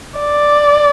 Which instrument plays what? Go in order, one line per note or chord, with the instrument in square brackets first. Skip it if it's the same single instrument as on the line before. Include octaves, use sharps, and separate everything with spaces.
[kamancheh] D5